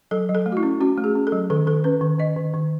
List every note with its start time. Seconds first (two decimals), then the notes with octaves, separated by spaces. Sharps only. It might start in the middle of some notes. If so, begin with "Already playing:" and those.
0.11 F#3 A4
0.29 F#3
0.35 A4
0.46 A3
0.52 F#4
0.57 E4
0.63 C#4
0.81 C#4 F#4
0.98 A3
1.04 G#4
1.15 C#4
1.27 A4
1.32 F#3
1.50 D#3 A4
1.67 D#3 A4
1.84 C#4 B4
2.01 D#3
2.19 D#3 D#5
2.37 D#3
2.54 D#3